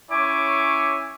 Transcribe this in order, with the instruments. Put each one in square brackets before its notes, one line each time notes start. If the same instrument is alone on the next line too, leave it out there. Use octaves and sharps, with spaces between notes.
[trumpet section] C#4 E4 C#5 G#5 D6